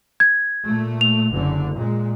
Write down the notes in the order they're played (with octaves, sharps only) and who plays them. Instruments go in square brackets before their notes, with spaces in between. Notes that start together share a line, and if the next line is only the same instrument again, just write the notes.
[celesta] G#6
[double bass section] A#2 A3
[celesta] F7
[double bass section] F#1 D3
A#2 G#3